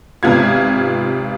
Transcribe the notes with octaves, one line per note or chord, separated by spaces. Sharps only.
G#1 C3 B3 F4 G#6